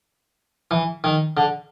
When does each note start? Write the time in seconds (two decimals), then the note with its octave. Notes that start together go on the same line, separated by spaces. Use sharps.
0.71 E3
1.04 D#3
1.37 D3